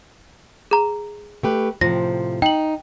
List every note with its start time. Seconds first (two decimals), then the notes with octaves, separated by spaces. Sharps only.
0.71 G#4 A#5
1.43 A3 G4 B4
1.81 A2 C3 F3 A#6
2.42 D#4 G5 F#7